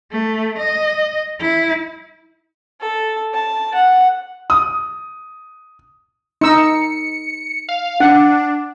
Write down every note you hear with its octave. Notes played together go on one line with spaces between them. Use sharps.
A3
D#5
E4
A4
A5
F#5
D#6
D#4 E6 C#7
F5
D4 F#5